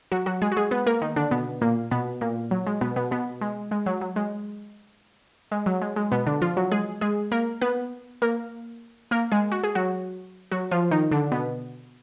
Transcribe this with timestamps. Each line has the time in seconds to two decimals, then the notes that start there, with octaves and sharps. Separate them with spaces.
0.12 F#3 F#4
0.26 F#3 F#4
0.42 G#3 G#4
0.52 F#4
0.57 G#3 G#4
0.71 B3 B4
0.86 A#3 A#4
1.01 D#3 D#4
1.16 D3 D4
1.31 B2 B3
1.62 A#2 A#3
1.91 B2 B3
2.21 A#2 A#3
2.51 F#3
2.67 G#3
2.81 B2 B3
2.96 B2 B3
3.11 B2 B3
3.41 G#3
3.71 G#3
3.86 F#3
4.01 F#3
4.16 G#3
5.52 G#3
5.66 F#3
5.82 G#3
5.96 G#3
6.12 B2 B3
6.27 D3 D4
6.42 F3 F4
6.57 F#3 F#4
6.71 G#3 G#4
7.01 G#3 G#4
7.32 A#3 A#4
7.62 B3 B4
8.22 A#3 A#4
9.11 A#3 A#4
9.32 G#3 G#4
9.52 F#4
9.64 G#4
9.75 F#3 F#4
10.51 F#3 F#4
10.71 F3 F4
10.91 D#3 D#4
11.11 D3 D4
11.32 B2 B3